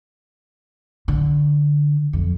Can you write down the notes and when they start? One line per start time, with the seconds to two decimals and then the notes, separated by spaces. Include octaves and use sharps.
1.08 D3
2.13 F2